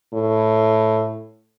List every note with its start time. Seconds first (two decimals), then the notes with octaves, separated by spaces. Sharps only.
0.14 A2